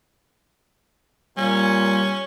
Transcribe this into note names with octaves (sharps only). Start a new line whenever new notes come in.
A#2 G3 C#4